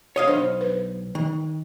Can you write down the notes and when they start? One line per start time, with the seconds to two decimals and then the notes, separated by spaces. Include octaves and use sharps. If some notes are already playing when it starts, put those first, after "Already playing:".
0.16 C#5 D#5 F5
0.28 B1 D4 C5 D#5
0.61 B4
1.15 D#3